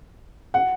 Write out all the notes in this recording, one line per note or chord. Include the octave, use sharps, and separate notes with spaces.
F#5